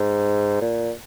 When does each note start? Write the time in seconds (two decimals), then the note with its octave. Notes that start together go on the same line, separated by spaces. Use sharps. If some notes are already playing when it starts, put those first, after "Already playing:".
Already playing: G#2
0.61 A#2